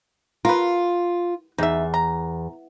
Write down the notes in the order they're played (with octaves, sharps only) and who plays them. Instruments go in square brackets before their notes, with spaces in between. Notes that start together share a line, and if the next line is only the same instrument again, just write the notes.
[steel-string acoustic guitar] F4 [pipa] A#4 B4
[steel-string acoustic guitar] E2 [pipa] D#4 E5
[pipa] A#5